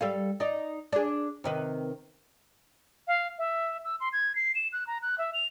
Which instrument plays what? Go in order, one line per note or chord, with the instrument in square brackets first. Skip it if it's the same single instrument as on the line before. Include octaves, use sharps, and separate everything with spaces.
[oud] G3 A4 F5
D#4 D5
D4 G#4
C3 D#3 B4
[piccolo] F5
E5
E6
C6
G#6
C7
E7
F#6
A#5
F#6
E5
F7